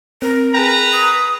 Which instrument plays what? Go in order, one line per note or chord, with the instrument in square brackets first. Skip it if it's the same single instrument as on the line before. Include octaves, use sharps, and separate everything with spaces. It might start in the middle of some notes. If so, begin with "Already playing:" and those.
[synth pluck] C4 [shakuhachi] A#4
[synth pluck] G#4 G5 [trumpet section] B4 A#5
[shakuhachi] D#6